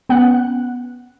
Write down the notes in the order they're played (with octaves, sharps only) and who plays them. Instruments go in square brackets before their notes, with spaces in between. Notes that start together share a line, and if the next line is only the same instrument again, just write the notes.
[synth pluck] B3 C#4 F#5 F#6